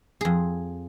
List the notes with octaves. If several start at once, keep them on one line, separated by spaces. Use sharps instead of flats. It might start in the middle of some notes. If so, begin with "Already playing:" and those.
F2 G#4